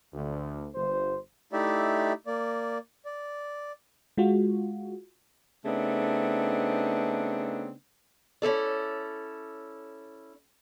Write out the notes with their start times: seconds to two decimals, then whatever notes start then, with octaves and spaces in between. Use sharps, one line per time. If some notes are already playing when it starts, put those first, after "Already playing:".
0.14 D2
0.75 G1 C5
1.53 A3 D#4 E4 G4 D5 E5
2.27 A#3 D5
3.05 D5
4.18 G#3 F4 F#4
5.66 C#3 A3 B3 C4 D4 D#4
8.42 C#4 E4 A4 D5